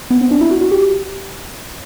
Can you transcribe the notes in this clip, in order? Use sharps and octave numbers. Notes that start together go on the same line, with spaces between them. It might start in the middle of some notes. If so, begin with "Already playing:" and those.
B3
C4
D4
E4
F#4
F#4
G4